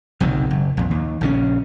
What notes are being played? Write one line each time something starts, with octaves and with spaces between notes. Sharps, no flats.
F#1 B1 C3 D#3
F#1
A#1 F2
D#2
A#1 C#3 E3 C#4